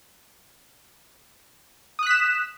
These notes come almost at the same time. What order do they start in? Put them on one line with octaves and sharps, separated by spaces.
D#6 F#6 B6 E7